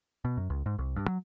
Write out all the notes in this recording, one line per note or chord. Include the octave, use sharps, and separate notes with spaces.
B2
F#2
C#2
G#2
C2
G2
F#3